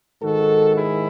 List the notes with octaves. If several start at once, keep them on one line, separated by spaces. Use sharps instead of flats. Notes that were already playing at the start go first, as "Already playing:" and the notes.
G#2 D#3 F#4 A4
E4 G#4